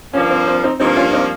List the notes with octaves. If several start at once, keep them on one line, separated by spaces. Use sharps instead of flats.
G2 F3 A#3 C#4
C4
C4
C4 D#4
G2 F3 A#3 C4 D#4
C#4 F4
C4 D#4